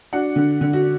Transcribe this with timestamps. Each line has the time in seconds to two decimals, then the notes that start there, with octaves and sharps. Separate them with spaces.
0.13 D4 F#4 F#5
0.36 D3
0.61 D3
0.73 F#4